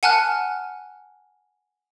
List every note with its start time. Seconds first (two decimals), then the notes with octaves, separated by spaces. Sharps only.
0.03 F#5 G#5 A5 F6 F#6